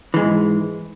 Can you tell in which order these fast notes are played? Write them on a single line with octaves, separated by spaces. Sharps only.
E3 G#3 G#2